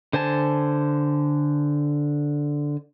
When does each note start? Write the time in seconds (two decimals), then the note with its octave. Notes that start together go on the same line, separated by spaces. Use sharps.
0.13 D3 C5 G#5 A5